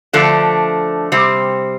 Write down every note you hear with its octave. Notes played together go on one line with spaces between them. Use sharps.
D3 F3 A3 D4
C3 G3 C4